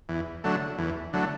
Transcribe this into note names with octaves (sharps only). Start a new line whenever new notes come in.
E2
D3 F#3 A3
E2
D3 F#3 A3